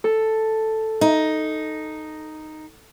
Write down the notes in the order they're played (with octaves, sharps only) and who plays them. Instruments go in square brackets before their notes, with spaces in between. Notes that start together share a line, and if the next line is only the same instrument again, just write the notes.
[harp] A4
[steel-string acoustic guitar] D#4